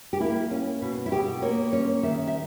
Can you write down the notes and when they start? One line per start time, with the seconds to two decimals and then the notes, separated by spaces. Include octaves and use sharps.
0.13 G4
0.20 A#3 E4
0.51 C#4
0.82 B2
1.06 E4
1.11 B2 G4
1.42 A#3 C#5
1.73 C#4 C#5
2.03 D#3 E5
2.28 E5